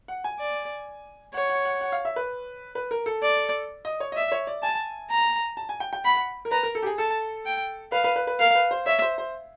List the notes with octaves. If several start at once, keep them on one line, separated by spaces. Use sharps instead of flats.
F#5
G#5
D5
C#5 F#5
F#5
F#5
F#5
F5
E5
B4
B4
A#4
A4
D5
D#5
C#5
D#5
D5 E5
C#5
D5
G#5 A5
A#5
A5
G#5
G5
G5
F#5 B5
F#5
A#4
B4 A#5
A#4
A4
G4
G#4
A4 A5
G5
B4 F5
B4
B4
B4
A#4 F5
B4
C5
C#5 E5
C5
C5